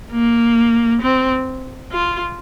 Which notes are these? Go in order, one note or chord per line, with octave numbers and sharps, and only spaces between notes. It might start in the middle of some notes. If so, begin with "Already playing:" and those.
A#3
C4
F4